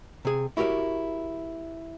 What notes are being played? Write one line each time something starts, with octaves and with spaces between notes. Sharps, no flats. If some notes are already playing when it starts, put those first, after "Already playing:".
C3 G#4
E4 F#4 G4 A#4 C#5